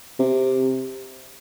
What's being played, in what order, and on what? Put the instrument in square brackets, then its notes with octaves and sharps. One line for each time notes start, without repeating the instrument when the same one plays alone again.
[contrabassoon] C3